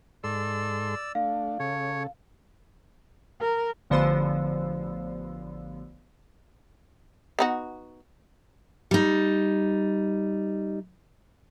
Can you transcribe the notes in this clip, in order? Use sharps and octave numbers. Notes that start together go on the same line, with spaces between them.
G#2 A4 D5 C6 E6
A3 D4 F5
C#3 A4 C#5
A#4
A1 D3 F3 B3 C5 E6
B3 D#4 F#4
G3 D#4